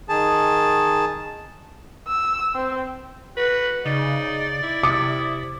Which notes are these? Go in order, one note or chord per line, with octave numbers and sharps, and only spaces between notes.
D#3 G#4 A5
E6
C4
F#4 B4
C#3 D#4 D5
E4
C3 D6 D#6 C#7